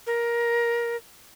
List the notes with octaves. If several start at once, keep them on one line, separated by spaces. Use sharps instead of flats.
A#4